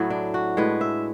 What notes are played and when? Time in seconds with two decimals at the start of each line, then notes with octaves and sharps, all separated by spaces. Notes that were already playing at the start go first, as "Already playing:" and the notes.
Already playing: A2 F#3 A3 E4
0.10 D4
0.34 F#4
0.57 A2 G#3 B4
0.81 E5